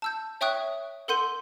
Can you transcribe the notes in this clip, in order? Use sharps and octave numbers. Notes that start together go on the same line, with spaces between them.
A5 E6 G6
C#5 E5 G5 C#6 D#6 F#6
A4 A#4 F#5 C6 G6 D#7